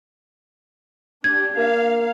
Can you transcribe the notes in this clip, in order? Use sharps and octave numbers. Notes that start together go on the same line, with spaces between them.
D4 G4 G#6
A#3 F5